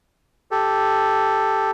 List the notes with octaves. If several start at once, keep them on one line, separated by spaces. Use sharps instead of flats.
G4 A4